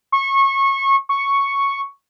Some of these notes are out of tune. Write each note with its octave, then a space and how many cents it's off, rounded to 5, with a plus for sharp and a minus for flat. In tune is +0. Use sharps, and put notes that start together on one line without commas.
C#6 -25
C#6 +0